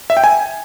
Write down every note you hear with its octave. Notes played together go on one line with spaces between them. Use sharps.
E5
G5
G#5